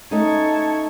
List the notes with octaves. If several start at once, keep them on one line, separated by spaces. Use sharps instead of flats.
A3 C#4 D#4 A5 C#6 G#6